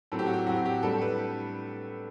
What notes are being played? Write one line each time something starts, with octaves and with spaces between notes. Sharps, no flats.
A2 F#3 C4 A4
G4
F#4
G4
A2 F#3 C4 F#4
G4
A2 G3 D4 A4
B4